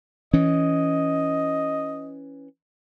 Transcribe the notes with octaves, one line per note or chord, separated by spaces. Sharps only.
E3 C#4 D#5